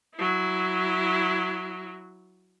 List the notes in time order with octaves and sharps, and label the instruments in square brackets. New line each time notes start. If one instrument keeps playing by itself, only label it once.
[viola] F#3 E4